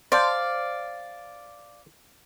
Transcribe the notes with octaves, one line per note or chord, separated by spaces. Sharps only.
C5 D5 F5 A5